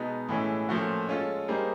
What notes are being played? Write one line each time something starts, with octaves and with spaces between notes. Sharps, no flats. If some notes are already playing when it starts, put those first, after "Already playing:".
Already playing: B2 G#3 B3 D#4
A2 E3 G#3 C#4
A#2 F3 A3 C#4 F#4
G#3 C#4 F4 A4
G3 A#3 D#4 G#4 C5